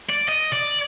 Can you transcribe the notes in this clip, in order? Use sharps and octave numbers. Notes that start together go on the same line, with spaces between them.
D5
D#5
D5